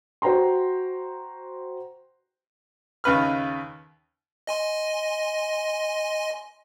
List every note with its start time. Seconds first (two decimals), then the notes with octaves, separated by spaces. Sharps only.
0.22 F#4 C5 G5 A#5 C6
3.04 D#2 C#3 B4 F6
4.47 D#5 G#5 C6